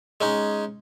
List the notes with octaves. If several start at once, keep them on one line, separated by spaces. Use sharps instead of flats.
G#3 C#4 D#4